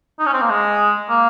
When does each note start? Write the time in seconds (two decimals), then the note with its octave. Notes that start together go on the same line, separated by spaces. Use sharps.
0.19 D#4
0.26 C#4
0.33 C4
0.42 A#3
0.50 G#3
1.10 A#3